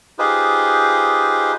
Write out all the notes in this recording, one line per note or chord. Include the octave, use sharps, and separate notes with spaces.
D#4 F4 G4 G#4 B4 C5